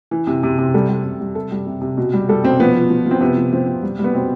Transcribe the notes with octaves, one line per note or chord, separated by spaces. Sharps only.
E3
C3
C3
C3
G3 A4
G3
C3
G3
C3 A4
G3
C3
C3
B2
G3
G3 A4
B2 C4
F3 B3
F3
F3
F3 C4
C3 B3
F3
F3 C4
C3
G3
G3 B3
B2 C4